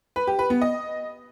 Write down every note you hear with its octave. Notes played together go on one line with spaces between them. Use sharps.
B4
G4
B4
B3
D#5